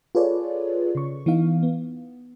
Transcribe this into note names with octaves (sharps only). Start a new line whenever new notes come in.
F4 G#4 A4 B4 C#5 D5
C#3 C#6
E3 B3 D#4 F5
B3